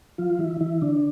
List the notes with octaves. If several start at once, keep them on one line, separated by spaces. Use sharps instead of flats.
F3 F4
E3 E4
E3 E4
D3 D4